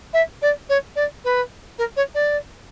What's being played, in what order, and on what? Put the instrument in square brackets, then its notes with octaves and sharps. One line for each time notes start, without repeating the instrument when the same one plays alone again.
[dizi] E5
D5
C#5
D5
B4
A#4
C#5
D5